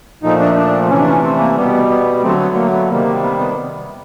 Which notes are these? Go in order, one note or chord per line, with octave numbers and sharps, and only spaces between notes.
A#2 F3 A3 D#4
D4
D4
C3 E3 A3 C#4
D4
C#4
C4
A#3
B2 G3 B3
B3
D3 F#3 A3 C4
B3
A#3
B3
C3 D#3 G3 A#3
B3
B3